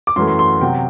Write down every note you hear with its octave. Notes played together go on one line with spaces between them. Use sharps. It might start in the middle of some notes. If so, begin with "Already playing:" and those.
D6
F#2 E3 A3 C6
C6
C6
C3 F#3 B3 G5